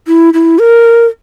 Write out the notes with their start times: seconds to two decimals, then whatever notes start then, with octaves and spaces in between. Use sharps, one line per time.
0.08 E4
0.34 E4
0.59 A#4